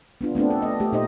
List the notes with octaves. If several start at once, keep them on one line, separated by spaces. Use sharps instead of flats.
B3 D4 F4
A3 B3 C4 D4
A4
D#5
A3 G4
A#2 D#4 C5 D#5